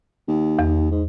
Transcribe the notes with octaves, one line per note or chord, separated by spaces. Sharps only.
D#2
E2
G#2